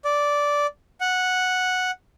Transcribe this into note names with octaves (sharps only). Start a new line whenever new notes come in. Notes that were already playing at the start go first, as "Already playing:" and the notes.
D5
F#5